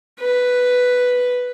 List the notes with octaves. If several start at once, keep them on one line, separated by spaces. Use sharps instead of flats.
B4